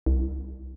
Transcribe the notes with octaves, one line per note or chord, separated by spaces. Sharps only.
C2